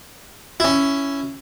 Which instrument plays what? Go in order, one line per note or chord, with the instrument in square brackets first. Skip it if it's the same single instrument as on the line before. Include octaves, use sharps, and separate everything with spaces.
[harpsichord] C#4 E4